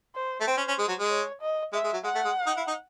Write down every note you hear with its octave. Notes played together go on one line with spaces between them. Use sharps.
C5
A3
C4 C5
C#4
C#4
G#3
F#3
G#3
C#5
D#5
G#3 E5
G#3
F#3
G#3 F#5
A3
G#3
D#4
E4
D#4